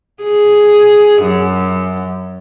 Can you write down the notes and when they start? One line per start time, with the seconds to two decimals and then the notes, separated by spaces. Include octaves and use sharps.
0.23 G#4
1.23 F#2